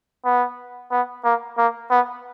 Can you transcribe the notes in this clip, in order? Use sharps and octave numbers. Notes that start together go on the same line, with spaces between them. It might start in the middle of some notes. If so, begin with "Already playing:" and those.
B3
B3
A#3
A#3
B3